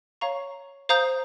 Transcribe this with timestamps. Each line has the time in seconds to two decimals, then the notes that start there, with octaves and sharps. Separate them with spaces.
0.21 C#5 F5 A#5 C#6
0.89 C5 F5 A#5 D#6 G6